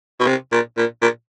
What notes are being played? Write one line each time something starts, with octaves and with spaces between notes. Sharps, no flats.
B2
C3
A#2
A#2
A#2